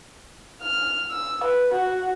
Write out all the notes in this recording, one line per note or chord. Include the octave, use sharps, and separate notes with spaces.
F6
E6
B4
F#4